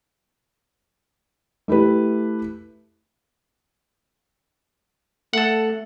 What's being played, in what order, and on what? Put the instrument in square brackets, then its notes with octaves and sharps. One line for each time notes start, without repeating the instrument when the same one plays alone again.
[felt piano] A3 E4 G4 B4
[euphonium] A3 [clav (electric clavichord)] A4 F#5